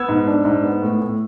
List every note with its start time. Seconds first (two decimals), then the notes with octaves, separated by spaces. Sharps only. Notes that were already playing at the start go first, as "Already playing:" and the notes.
Already playing: B3 E6 G#6
0.09 G#2
0.27 D4
0.45 G#2
0.64 B3
0.82 A2
1.01 A2